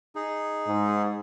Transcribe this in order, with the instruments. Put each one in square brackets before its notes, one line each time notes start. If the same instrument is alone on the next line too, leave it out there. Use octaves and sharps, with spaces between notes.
[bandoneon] D#4 G#4
[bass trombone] G#2